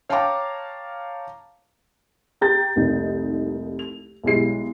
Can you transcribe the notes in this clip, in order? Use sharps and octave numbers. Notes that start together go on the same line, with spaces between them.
C#5 F5 G5 A5 A#5 D6
G4 A#5 G6 A6
F1 C2 A#3 D#4
F7
B1 G3 G#3 E4 C7